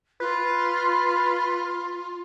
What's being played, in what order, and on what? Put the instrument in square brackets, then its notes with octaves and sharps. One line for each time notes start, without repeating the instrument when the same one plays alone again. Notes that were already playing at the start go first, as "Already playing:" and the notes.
[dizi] F4 [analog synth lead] B4